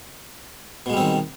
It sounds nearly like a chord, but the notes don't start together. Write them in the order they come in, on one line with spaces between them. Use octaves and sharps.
B2 G#3 G3 C4 D#3